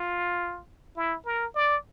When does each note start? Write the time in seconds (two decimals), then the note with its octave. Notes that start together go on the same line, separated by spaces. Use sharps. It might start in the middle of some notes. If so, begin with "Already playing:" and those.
Already playing: F4
0.96 E4
1.26 A#4
1.55 D5